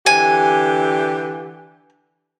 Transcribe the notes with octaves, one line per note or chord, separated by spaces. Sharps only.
D3 E3 G4 G#5